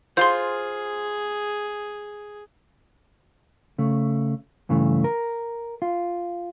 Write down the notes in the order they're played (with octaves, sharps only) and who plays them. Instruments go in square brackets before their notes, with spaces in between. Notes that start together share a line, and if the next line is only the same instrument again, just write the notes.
[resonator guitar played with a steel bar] F4 C5 [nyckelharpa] G#4 [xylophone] C6 G6
[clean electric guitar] C#3 A3
G2 C#3 E3 A3
A#4
F4